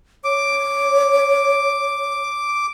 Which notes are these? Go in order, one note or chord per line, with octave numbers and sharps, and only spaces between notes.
C#5 D6